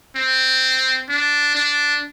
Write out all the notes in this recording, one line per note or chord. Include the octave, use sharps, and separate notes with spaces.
C4
D4
D4